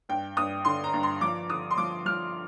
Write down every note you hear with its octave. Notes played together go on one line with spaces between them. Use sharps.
G2 G5
G2 D#6
D3 C6
A#5
G2
C6
F3 D6
D3 D#6
C6
F3 D6
F3 F6